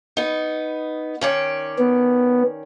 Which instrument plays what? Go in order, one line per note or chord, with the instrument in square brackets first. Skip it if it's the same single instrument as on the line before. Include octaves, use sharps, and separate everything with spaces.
[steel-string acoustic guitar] B3 D#4
D#3 C#4 D5
[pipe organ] B3